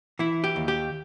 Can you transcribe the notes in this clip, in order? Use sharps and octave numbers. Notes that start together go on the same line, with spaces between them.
E3 E4
G4
D#2
G4